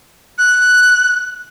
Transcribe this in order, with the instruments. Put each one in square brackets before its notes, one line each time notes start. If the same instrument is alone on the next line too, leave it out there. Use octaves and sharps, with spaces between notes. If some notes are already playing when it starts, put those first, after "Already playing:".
[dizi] F#6